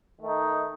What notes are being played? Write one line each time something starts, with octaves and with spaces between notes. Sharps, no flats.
D#3 A3 D#4